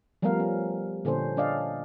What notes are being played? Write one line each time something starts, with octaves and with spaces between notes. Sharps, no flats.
F3 G3 A3 B3 A#4 F5
C#4
A#2 D3 C#4 D4 C5
C#4 D4 D5 D#5 F5